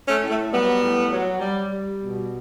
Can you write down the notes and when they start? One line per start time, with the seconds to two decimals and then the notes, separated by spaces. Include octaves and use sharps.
0.08 A3 C#4
0.23 A2
0.30 A3
0.52 F#3 G3 B3
0.82 A2
1.12 F#3
1.41 G3
1.71 G3
2.01 B2